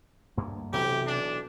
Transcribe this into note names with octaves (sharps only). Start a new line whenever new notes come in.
D2 G2 A#3
B1 C3 E3 G4
D4